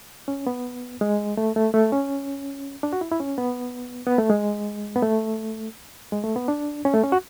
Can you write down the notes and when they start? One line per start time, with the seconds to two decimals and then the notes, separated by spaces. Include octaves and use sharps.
0.28 C#4
0.47 B3
1.01 G#3
1.37 A3
1.56 A3
1.74 A3
1.92 C#4
2.83 D4
2.93 F#4
3.01 E4
3.11 E4
3.20 C#4
3.38 B3
4.07 B3
4.18 A3
4.30 G#3
4.96 B3
5.02 A3
6.12 G#3
6.24 A3
6.36 B3
6.48 D4
6.85 C#4
6.94 A3
7.03 C#4
7.12 F#4